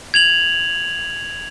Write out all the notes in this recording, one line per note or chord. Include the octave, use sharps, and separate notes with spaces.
G#6 F7 F#7